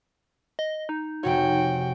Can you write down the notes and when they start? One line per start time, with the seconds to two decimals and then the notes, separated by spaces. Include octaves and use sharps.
0.59 D#5
0.89 D#4
1.23 F1 C3 F#4 C#5 G5